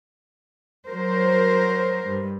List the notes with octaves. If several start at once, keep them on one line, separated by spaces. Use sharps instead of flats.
F#3 A#4 C5
G2